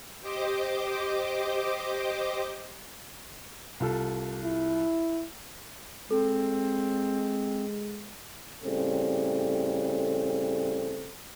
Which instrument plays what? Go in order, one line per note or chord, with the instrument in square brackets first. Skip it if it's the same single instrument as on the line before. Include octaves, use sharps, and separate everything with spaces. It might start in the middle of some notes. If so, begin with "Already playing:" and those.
[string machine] G4 C5 D#5 D6
[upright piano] C2 F4 A4
[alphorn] E4
[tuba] G#3 [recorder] C4 [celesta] A4
[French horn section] A2 C#3 G3 C4 A4